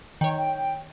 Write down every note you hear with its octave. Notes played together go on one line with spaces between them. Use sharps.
D#3 C#5 G5